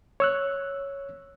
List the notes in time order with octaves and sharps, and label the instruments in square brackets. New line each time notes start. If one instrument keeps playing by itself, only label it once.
[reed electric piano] C#5 E6 F#6